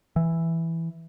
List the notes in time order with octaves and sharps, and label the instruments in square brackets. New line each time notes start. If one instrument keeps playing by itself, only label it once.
[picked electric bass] E3